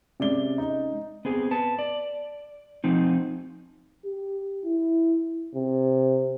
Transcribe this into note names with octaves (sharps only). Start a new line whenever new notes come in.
C3 G#3 C#4 D5 G7
D#4
B3 C4 G#4
B4 A5
D5
F3 C4 D#4
G4
E4
C3